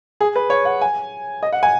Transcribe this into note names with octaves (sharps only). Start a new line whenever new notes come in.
G#4
B4
C#5
F#5
G#5
D#5
F#5
G#5